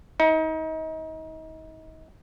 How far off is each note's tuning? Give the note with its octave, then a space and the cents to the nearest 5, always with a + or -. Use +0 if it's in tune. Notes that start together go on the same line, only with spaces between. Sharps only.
D#4 +35